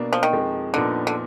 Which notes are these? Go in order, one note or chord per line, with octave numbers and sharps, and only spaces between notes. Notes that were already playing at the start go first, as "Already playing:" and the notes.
Already playing: B2 A#3 D4
F3
D#3
F2 F3 G#3
A#2 D3 F3 B3 D#4
D3